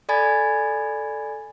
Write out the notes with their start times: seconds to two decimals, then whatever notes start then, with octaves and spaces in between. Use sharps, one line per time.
0.09 A4 D5 G#5 B5 G#6 A6